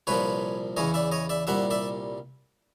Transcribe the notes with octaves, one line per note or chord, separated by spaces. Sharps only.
C2 A#2 F3 B4 C#5
E2 C#3 E3 C#5 D#5
D5 E5
C#5 D#5
D5 E5
C2 A#2 G3 E5 F#5
D5 E5